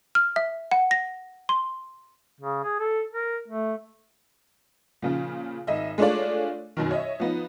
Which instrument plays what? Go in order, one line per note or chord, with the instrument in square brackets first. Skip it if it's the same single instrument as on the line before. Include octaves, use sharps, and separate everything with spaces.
[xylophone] F6
E5
F#5
A#6
C6
[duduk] C#3
G#4
A4
A#4
A3
[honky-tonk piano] A#2 C#3 F3
G#1 D#5 E5
G#3 A3 D4 F4 C#5 D5
F#2 B2 D#3
C#5 D#5 E5
F3 B3 D#4